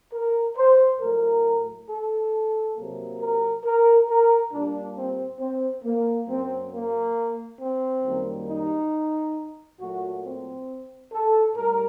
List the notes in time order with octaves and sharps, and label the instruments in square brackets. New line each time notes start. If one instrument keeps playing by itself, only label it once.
[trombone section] A#4
C5
A2 F#3 A3 A#4
A4
C3 F#3 A#3
A#4
A#4
A#4
A#2 G3 A#3 D4
C4
C4
A#3
F#2 F#3 A#3 C4
A#3
C4
F#2 D#3 G3 A#3
D#4
A#2 F#3 A3 F#4
C4
A4
A2 G3 A#4